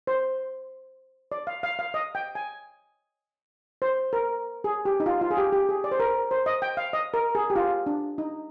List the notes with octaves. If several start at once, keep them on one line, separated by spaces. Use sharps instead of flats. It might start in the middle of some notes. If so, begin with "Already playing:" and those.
C5
D5
F5
F5
F5
D#5
G5
G#5
C5
A#4
G#4
G4
D#4
F4
F4
G#4
G4
G4
G#4
D5
C5
A#4
C5
D#5
G5
F5
D#5
A#4
G#4
G4
F4
D4
D#4